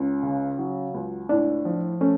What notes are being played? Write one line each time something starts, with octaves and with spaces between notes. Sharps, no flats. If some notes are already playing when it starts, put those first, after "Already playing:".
Already playing: C#2 C#4
C#3
F#3
C#2
A2 D4
F3
A3 C#4